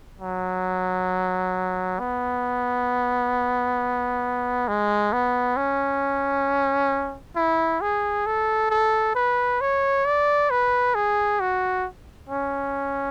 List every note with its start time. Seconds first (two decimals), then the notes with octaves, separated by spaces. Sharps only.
0.20 F#3
1.99 B3
4.68 G#3
5.13 B3
5.57 C#4
7.36 E4
7.81 G#4
8.26 A4
8.70 A4
9.15 B4
9.61 C#5
10.06 D5
10.50 B4
10.95 G#4
11.40 F#4
12.29 C#4